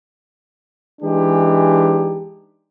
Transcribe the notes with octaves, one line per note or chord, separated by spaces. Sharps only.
E3 G#3 D4 D#4 G4